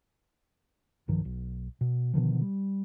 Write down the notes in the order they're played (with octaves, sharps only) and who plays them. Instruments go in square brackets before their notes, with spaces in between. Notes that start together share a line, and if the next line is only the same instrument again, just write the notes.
[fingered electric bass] B1 G2 D#3 F3
B1
B2
B2 D3 D#3 F3
G3